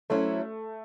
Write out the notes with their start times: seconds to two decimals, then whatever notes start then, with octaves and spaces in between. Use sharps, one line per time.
0.10 F#3 A3 C#4 E4 C5